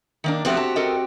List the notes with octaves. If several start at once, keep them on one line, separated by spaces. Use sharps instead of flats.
D#3 A#3 D4
F3 A3 B3 C4 F#4 G4
A5
A4 A#4 D#5